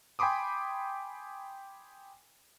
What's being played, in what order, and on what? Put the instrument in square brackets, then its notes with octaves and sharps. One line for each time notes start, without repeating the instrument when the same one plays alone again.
[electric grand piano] G5 G#5 B5 C6 D6 D#6